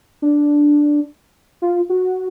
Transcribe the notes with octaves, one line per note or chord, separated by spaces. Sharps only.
D4
F4
F#4